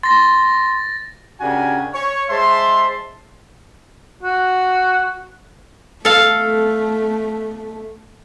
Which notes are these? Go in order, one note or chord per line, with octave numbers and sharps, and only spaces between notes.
C6 A6 A#6
C#3 D4 F#4 G4 A#4 G#5
C#5
G#3 C5 E5 A5 C6
F#4
A3 A4 F5